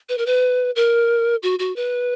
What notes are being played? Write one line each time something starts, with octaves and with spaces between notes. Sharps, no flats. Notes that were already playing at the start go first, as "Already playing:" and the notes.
B4
A#4
B4
A#4
F#4
F#4
B4